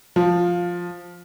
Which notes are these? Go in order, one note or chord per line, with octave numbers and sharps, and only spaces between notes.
F3